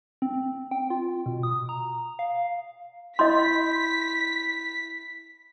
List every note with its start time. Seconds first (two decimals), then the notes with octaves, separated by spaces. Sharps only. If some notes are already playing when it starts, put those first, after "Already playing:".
0.22 C4
0.71 G5
0.90 F4
1.26 B2
1.43 D#6
1.69 A#5
2.19 F5
3.19 E4 D#5 B5 C6 G6 B6